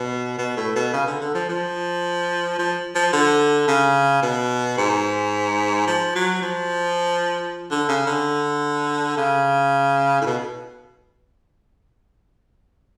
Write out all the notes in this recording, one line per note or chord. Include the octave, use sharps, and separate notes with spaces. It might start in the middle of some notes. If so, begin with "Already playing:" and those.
Already playing: B2
B2
A2
B2
C#3
D3
D3
F3
F3
F3
F3
D3
C#3
B2
G#2
F3
F#3
F3
D3
C#3
D3
C#3
A2
B2